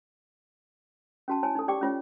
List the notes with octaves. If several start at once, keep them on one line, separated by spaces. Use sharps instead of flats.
C#4 F#4 A5
E4 C#5 G#5 A5
D#4 A4
G4 D5 G5 D6
C#4 F4 C#5